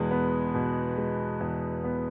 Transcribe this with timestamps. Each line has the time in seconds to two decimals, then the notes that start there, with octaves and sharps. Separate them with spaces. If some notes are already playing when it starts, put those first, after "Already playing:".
Already playing: E2 B2 G#3
0.11 B3
0.55 B2
0.98 G#3
1.40 E2
1.84 B3